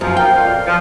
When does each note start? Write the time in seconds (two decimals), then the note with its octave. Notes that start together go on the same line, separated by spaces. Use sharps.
0.01 F#2 F3
0.17 A#4 F5 G5
0.36 F2 A#2 F5
0.66 F3